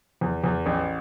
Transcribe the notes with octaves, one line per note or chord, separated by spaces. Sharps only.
E2
E2
A1